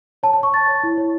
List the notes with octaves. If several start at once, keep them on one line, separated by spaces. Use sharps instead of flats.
C#5 A5
A5
C#5
C#6
C#5 A6
C#5
E4
C#5